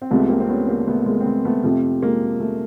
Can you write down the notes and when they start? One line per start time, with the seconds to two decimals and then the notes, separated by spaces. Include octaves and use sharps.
0.02 C4
0.11 C2 C3 F3 G#3 A3 B3
0.29 A#3 C4
0.40 C4
0.49 B3 C#4
0.69 A#3 C4
0.87 A3 B3
1.06 G#3 A#3
1.20 C4
1.25 A3 B3
1.45 A3 B3
1.64 F2 C3 F3 A3
2.02 G#3 A#3
2.40 A3